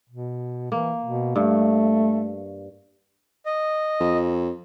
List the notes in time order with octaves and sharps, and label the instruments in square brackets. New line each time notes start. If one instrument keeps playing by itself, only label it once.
[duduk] B2
[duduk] E3 [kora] A#3
[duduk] B2
[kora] G2 [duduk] A3
[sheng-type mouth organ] D#5
[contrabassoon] F2